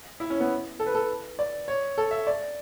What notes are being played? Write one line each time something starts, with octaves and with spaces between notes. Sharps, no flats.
E4
C#4
B3
A4
B4
A4
D5
C#5
A4
E5
D5